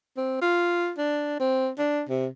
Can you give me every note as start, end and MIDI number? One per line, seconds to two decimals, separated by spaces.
0.17 0.38 60
0.42 0.92 65
0.98 1.35 62
1.40 1.70 60
1.79 2.03 62
2.09 2.27 48